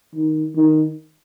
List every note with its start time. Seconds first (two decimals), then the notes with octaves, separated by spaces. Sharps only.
0.15 D#3
0.55 D#3